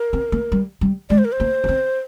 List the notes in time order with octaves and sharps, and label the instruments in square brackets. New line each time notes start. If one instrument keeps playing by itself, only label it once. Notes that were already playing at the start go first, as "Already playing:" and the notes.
Already playing: [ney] A#4
[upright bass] C4
A#3
G3
G3
[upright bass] G#3 [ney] D5
[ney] C5
A#4
C5
[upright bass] A#3
D4
C4